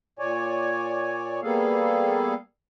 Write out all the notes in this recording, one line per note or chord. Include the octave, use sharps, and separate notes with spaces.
A#2 C#5 D5 G#5
G3 A#3 B3 G#4 A4 F5